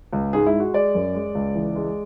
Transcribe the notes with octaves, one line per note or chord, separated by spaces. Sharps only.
C#2
G#2 G#4
E4
G#3
F#4
G#3 D5
F#2
G#3
C#2
E3
G#3